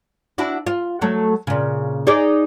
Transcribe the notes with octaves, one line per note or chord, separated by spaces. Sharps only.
D4 E4 F#4
F4
F#3 A3
A#2 C#3
D#4 G#4 D5